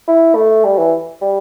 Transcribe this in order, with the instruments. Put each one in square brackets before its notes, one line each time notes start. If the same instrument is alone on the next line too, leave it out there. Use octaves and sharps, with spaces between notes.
[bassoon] E4
A3
G3
E3
G3